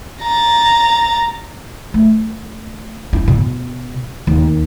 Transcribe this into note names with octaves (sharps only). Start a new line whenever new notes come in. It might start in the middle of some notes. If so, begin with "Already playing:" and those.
A#5 A6
A3
E4
B2
D#2